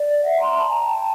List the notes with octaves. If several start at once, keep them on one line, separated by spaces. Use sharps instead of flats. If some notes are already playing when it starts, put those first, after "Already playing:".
Already playing: D5
E5 F#5
A#5 C6
A5 B5
G#5 A#5
G5 A5